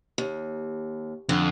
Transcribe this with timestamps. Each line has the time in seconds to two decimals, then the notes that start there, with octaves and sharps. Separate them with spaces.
0.18 D#2
1.29 F2 D3